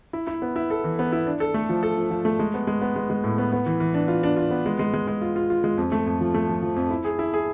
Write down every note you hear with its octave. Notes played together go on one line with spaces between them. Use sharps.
E4
E4
B3
E4
A4
E3
B3
E4
D4
A4
A3
F3
A4
F3
F3
A3
G#3
B3
G#3
B3
G#3
G#3
A2
B3
B3
E3
E3
D4
F4
D4
F4
B3
G#3
G#3
G#3
G#3
F4
F4
F4
G#3
F2
A3
F2
F3
A3
F3
F3
F2
E4
G#4
E4
G#4